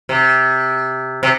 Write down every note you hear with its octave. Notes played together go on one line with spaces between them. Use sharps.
C3
C3